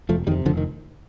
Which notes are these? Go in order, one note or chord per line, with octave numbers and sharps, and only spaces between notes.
F1 F3 A3
F2 C3 D#3 G3
F1 D3 F3
D#3